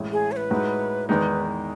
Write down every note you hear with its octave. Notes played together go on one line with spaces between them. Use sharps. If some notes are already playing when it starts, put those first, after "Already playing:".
Already playing: A1 A2 G#3
G#4
C#5
B4
A2 G#3 D#4 F#4
E2 D#3 G#3 D#4 B4